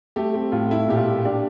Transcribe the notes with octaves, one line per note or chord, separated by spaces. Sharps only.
A3 G4
C4 G4
A2 F4
A3 E4
A#2 G4
F4
A#2
D4 G4